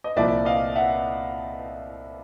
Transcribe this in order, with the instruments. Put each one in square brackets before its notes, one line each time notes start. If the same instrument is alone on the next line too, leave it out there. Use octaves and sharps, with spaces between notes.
[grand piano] D#5
C2 A#2 F3 A#3 D5 E5
D#5 F5
E5 F#5